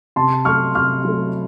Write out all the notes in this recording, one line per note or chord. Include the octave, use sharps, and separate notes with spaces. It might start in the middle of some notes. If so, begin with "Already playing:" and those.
C3 A5 C6
F#3 A3 C#6 F6
C3 C#6 F6
F#3 A3